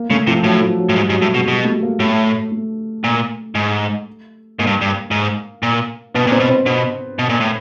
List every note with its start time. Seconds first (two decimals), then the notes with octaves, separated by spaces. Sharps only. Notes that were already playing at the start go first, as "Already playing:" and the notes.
Already playing: A#3
0.10 C#3 A3
0.27 C3 F3
0.44 A2 F#3
0.62 F3
0.79 F#3
0.89 A2
0.96 G#2 G3
1.09 G#2 F#3
1.22 A2 G3
1.34 B2 G#3
1.48 B2 G3
1.65 A3
1.83 A#3
2.00 A2 A3
2.52 A3
3.04 A#2
3.55 G#2
4.59 G#2 A#3
4.67 G2
4.81 G2
5.11 G#2
5.63 A#2
6.15 B2 B3
6.27 A#2
6.32 C4
6.40 B2
6.49 C4
6.66 B2 C4
7.19 B2
7.29 A#2
7.40 A2